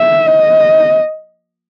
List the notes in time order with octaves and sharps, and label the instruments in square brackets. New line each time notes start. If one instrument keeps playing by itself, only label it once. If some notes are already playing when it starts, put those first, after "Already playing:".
Already playing: [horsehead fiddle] E5
D#5